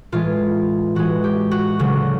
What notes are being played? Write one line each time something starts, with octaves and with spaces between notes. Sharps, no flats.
A2 E3 G#3 F4
A2 E3 G#3 F#4
G4
F#4
D2 C#3 F#3